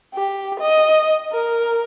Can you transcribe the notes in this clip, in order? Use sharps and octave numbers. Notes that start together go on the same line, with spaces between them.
G4
D#5
A#4